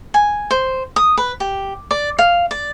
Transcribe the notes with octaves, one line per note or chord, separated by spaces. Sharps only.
G#5
C5
D#6
B4
G4
D5
F5
D5